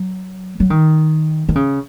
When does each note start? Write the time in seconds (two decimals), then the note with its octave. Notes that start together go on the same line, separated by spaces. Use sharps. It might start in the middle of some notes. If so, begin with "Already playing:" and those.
Already playing: F#3
0.60 F#3
0.70 D#3
1.49 D#3
1.55 C#3